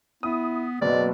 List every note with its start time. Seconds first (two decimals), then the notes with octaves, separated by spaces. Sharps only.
0.23 B3 E4 D#6
0.82 F#1 B2 F#3 D5